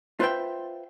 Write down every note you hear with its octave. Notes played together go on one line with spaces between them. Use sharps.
F4 B4 C5 E5 G5